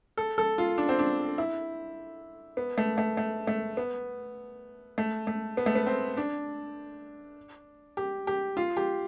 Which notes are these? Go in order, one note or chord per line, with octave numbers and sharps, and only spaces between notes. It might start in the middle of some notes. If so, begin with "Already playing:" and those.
A4
A4
F4
D4
C4
D4
E4
B3
A3
A3
A3
A3
B3
A3
A3
B3
A3
B3
C4
D4
G4
G4
F4
G4